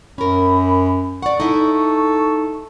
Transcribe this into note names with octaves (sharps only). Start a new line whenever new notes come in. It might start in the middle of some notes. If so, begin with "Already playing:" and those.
F#2 C#4 A#4 B5
D5 F#5 C#6
D#4 E4 A4